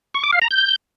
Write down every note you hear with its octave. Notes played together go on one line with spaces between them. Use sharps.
C#6
D6
F5
A#5
G6